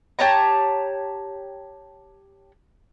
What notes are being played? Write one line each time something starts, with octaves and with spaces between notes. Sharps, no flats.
G4 C#5 A5 A#5